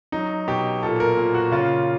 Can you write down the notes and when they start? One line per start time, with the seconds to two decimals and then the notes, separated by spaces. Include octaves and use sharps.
0.12 F#3 D#4
0.47 B2 G4
0.83 A#2 A4
1.00 A#4
1.17 A#2
1.34 F#4
1.51 C#3 F4